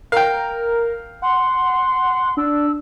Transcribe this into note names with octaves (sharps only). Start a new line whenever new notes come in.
A#4 F5 G5
F#5 C6
D4 E6